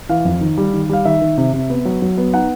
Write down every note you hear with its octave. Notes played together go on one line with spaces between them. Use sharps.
E3 F5
F2
D#3
G3
D#3
G3 F5
D#3 E5
D#3
C3
C3
B3
F#3
F#3
B3
D#4 F#5